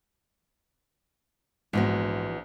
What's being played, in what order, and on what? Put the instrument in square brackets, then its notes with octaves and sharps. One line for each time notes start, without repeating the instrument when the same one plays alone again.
[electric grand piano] A#1 [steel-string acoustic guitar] G#2 [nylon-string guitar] E3 B3 F#4